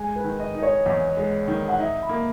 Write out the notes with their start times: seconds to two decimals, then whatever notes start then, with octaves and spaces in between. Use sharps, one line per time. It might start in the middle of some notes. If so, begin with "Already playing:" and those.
Already playing: G#3 G#5
0.16 B4
0.24 D#3
0.40 D#5
0.55 D#4
0.62 C#5
0.86 E2 D#5
1.17 G#3
1.48 D#3
1.69 F#5
1.79 D#4 E5
2.02 B5
2.09 A#3